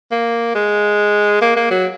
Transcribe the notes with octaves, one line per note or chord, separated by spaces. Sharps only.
A#3
G#3
A#3
A#3
F#3